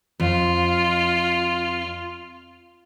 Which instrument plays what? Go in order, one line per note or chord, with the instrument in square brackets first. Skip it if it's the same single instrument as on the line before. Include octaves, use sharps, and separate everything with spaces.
[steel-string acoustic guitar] F2 [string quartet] F4